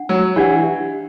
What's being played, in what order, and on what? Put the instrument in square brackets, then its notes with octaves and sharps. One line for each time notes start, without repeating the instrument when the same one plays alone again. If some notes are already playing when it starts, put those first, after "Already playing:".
Already playing: [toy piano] D4 F#5
[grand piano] F#3
[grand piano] E3 [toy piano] D4 G4 D5 F#5